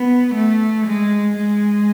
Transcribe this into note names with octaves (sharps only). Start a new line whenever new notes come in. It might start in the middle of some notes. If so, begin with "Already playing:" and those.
Already playing: B3
A3
G#3
G#3